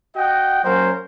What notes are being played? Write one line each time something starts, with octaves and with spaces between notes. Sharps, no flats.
F#4 D#5 F#5 G5
F#3 A#3 C#4 A#4 C5